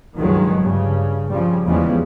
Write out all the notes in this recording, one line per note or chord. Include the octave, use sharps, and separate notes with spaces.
C#2 G2 D#3 F3 F#3 G#3
G2 C#3
C#3 F3 G3
E2 C#3 F3 G3 G#3 B3